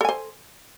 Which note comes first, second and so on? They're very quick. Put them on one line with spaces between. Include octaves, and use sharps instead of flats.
A4 G#5 C5